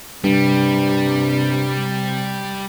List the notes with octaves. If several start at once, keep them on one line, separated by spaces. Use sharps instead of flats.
G2 C3 G3